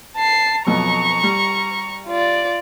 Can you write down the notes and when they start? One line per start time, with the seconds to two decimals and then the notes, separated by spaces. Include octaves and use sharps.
0.16 A5 C7
0.67 F2 B2 F#3 A#5 C#6
1.23 G3
2.07 F4 D5